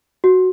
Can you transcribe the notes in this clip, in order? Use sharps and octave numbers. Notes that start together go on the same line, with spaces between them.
F#4